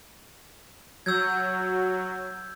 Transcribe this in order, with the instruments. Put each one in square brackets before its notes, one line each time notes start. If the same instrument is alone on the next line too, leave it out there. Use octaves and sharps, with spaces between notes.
[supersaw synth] F#3 [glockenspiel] E6 G6 G#6